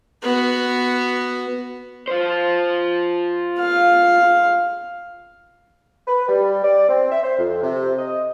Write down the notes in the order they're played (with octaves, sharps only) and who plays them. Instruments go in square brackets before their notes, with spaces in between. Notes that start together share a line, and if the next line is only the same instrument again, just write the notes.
[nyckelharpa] B3 F#4
[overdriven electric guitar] F4 C5
[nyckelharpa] F5
[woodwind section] B4
G3
D5
C4
E5
C5
F2
C3
D#5